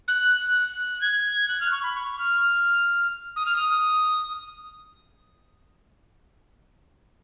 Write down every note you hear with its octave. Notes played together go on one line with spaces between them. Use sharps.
F#6
G#6
F#6
F6
C#6
B5
C#6
F6
D#6
F6
D#6